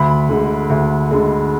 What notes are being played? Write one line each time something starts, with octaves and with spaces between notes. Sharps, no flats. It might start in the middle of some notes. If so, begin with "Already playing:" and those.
Already playing: D2 B5
D3 G#3
D2
D3 G#3